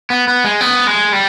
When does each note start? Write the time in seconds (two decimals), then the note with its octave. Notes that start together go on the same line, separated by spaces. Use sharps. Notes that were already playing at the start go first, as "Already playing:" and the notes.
0.10 B3
0.28 B3
0.44 G#3
0.61 B3
0.87 G#3
1.13 G3